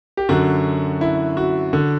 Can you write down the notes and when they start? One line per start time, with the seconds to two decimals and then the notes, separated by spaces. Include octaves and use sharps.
0.17 G4
0.29 F#2 D3 F#4
1.01 E4
1.37 F#4
1.73 D3